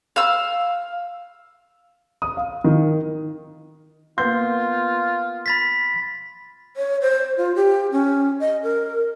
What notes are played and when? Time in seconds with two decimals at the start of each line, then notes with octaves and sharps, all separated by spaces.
0.16 F5 E6
2.22 D#6
2.37 F5
2.64 D#3
4.18 A#3 B3 F4 C6 G6
5.46 B5 A6 B6
6.77 C#5
7.02 C5
7.37 F4
7.56 G4
7.92 C#4
8.40 D#5
8.63 A#4